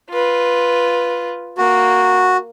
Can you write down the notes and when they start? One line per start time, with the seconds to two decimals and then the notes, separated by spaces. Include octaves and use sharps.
0.11 F4 B4
1.58 A#3 F#4